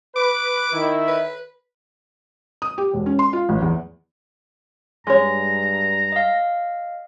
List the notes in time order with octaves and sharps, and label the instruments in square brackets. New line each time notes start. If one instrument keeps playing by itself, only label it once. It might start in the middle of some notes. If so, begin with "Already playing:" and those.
[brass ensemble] B4 [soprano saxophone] D6
[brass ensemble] D#3 E4
[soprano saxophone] B4
[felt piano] D#6
G4
E1
C#4
C6
F4
A1
E2
[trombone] G2 [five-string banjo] G#3 C#5 [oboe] A#5
[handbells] D#5 F5